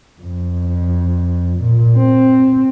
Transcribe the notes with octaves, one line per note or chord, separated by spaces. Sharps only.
F2
A#2
C4